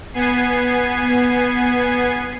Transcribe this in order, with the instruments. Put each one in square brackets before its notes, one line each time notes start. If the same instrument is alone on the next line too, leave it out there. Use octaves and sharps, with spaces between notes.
[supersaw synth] B3 G#5 C7